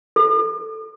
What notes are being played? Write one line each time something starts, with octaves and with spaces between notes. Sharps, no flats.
A4